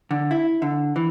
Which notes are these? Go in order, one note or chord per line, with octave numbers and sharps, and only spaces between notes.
D3
E4
D3
E3